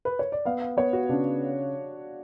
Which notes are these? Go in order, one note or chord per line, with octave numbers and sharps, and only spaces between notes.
B4
C#5
D5
B3 F5
F5
B3 C#5
F#4
C#3 D4